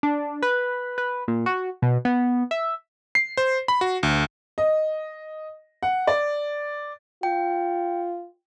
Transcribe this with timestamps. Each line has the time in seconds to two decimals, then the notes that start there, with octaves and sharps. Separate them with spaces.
0.03 D4
0.43 B4
0.98 B4
1.28 A#2
1.46 F#4
1.82 B2
2.05 B3
2.51 E5
3.15 C7
3.37 C5
3.68 B5
3.81 F#4
4.03 D2
4.58 D#5
5.83 F#5
6.07 D5
7.23 F4 G5